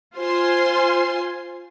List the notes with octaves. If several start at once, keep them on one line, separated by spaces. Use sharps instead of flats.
F4 C5 G#5 C6